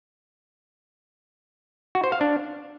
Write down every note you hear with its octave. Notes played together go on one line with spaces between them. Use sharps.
F#4
C5
F5
D4